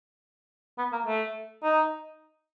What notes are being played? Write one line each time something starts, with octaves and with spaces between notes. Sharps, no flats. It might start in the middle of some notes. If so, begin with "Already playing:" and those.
B3
A#3
A3
D#4